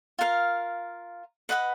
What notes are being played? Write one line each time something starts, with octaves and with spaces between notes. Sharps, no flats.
F4 A#4 F5
B4 D#5 F#5 B5